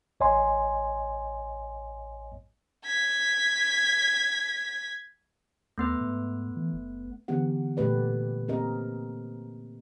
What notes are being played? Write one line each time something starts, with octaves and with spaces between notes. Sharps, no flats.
A1 C#5 D#5 G#5 C6
G#6 B6
D#2 A3 B3 B4
G#2
E3
F#1
D3 E3 B3 G4 F#5
A#2 A3 G4 B4 D5
A#3 C4 G4 A#4 D#5